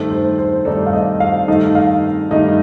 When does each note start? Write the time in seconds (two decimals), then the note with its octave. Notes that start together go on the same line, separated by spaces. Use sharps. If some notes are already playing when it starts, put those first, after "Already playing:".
Already playing: G2 D#3 A3 D#4 A4 C5
0.10 C5
0.38 C5
0.65 G2 D#3 A3 D#4 A4 D5
0.87 F5
0.93 D#5
1.20 F5
1.48 G2 D#3 A3 D#4 A4 D#5
1.75 F5
2.31 G2 D#3 A3 D#4 A4 D#5